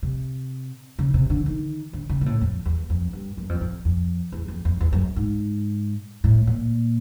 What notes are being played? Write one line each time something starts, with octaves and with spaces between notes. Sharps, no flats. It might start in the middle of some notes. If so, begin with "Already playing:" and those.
C3
C#3
C3
D3
D#3
D3
C#3
A#2
A2
F2
E2
F2
G2
F#2
F2
F2
F2
E2
F2
F2
E2
F#2
G#2
A2
A#2